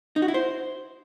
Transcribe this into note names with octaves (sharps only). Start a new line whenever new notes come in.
D#4
F#4
E4
C5